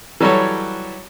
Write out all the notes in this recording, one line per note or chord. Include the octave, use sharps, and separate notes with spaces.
E3 F#3 G3 F#4 A4 C#5